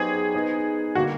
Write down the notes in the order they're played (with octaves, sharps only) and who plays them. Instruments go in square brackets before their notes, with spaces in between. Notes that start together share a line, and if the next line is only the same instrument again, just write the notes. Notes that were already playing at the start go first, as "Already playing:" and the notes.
Already playing: [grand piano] F#3 B3 D#4 G4 C5 [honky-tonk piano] G#4
[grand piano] B3 D#4 G#4 C5
[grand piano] D3 G3 A#3 [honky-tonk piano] F#4